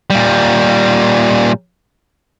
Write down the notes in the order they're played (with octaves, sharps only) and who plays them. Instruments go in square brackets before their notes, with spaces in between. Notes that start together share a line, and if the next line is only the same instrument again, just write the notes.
[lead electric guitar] A#2 G3